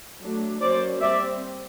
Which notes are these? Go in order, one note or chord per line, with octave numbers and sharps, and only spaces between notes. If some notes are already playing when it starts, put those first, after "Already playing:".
F#3 A3 D4
F#3 A#3 C#4 C5 D5
G3 C4 D5 E5